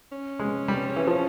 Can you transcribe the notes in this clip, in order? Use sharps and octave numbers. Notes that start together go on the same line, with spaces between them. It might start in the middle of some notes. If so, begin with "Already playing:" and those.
C#4
G#3
G3
E3
F3